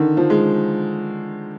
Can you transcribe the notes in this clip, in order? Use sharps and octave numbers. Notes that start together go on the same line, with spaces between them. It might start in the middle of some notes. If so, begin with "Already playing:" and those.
Already playing: D3 D#3
F3
G#3